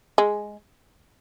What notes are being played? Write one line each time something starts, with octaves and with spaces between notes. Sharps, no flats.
G#3